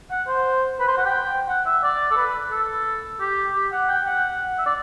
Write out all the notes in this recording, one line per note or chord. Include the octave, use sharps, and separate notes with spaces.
F#5
C5
B4
C5
F#5
G5
F#5
E5
D5
A4
B4
A4
G4
G4
F#5
G5
F#5
E5
D5